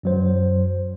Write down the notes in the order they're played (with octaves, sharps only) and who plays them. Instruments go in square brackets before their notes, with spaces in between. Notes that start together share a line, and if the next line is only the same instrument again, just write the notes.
[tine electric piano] F#2 F#3 C5